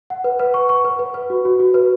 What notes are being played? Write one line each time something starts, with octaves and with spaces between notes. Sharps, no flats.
F#5
B4
B4
C#6
C#6
B4
B4
B4
F#4
F#4
F#4
B4